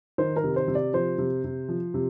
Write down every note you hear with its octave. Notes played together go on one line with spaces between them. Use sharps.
D#3 C5
A#4
C3
C5
C3
D5
F3 C5
C3
C3
F3
C3